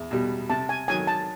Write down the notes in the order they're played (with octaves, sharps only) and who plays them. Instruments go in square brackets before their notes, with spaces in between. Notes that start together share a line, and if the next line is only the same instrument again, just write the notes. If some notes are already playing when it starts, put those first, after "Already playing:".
Already playing: [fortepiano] E2
B2 G3
[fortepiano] C3 [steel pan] A5
[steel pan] G#5
[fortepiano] D#3 F#3 [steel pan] G#5
[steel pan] A5